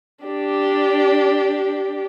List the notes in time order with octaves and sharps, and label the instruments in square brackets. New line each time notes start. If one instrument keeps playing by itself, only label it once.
[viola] D4 G4